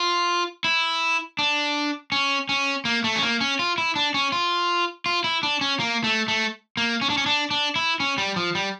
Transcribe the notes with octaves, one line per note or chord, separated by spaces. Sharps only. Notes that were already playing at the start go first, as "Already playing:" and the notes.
Already playing: F4
E4
D4
C#4
C#4
A#3
A3
C#4
A#3
C#4
F4
E4
D4
C#4
F4
F4
E4
D4
C#4
A#3
A3
A3
A#3
C#4
D4
C#4
D4
D4
E4
C#4
G3
F3
G3